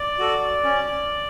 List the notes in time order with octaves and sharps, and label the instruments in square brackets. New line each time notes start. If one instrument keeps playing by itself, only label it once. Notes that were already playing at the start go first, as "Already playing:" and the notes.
Already playing: [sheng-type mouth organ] D5
F#4 A4
C#4